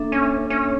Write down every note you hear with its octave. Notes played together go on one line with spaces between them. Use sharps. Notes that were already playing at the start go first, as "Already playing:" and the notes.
Already playing: A#3 D4 A4 E5
C#4
C#4